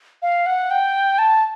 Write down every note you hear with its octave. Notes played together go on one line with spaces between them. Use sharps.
F5
F#5
G5
A5